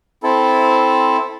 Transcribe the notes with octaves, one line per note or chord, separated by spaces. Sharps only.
C4 E4 A4